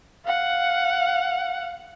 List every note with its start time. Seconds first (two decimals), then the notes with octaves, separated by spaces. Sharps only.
0.25 F5 F#5